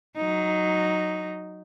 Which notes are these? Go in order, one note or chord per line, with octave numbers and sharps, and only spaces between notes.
F#3 D#4